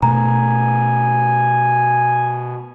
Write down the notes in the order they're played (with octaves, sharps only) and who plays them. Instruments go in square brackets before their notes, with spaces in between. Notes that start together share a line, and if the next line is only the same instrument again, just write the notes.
[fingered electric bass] B2 A3 [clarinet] G#5 [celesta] A#5